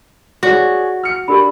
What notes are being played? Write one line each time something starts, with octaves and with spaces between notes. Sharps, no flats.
F#4 G#4 C#5 D5
F6 C#7
D4 G4 A#4 B5